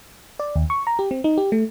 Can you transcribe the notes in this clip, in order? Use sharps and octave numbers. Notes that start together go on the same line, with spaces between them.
D5
D#2
C#6
A#5
G4
C4
D#4
G4
A3